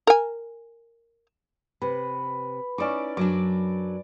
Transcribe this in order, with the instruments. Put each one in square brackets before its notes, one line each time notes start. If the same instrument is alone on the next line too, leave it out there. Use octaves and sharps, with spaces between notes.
[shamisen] A#4 G#5
[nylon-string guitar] C3 [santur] B4
[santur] C#4 D5 D6 [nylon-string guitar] D#4 E4
[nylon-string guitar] F#2 F#3 D4 [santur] D6